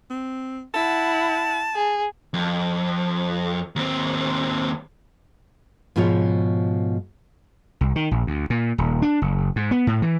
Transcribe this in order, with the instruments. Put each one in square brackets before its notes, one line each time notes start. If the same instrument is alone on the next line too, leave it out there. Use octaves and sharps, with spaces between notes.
[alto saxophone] C4
[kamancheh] E4 F#5 [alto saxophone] A5
[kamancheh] G#4
[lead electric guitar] F2
D#2 C4
[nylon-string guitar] G#2 B2 F3 F4 G4 C#5
[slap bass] C2
D#3
A#1
D2
A#2
D#1
D4
F#1
G#2
B3
A2
E3